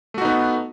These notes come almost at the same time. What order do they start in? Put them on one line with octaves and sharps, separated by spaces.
A3 F#4 D#4 B3